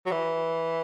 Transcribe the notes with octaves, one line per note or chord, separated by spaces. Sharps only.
F#3
E3